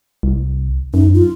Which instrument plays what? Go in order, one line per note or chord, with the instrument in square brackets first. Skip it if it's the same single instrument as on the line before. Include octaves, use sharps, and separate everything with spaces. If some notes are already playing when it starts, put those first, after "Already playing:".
[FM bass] C2
[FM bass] F#2 [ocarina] D#4
[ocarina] F4